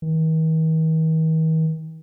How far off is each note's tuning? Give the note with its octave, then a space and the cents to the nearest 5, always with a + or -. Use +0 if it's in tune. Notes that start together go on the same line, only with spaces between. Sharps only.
D#3 +45